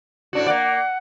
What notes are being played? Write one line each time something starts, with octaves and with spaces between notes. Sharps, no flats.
A2 D4 F#4
A#3 D5 F#5